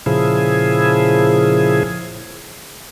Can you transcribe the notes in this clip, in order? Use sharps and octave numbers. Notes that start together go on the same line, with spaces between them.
A#2 C#3 F3 E4 G#4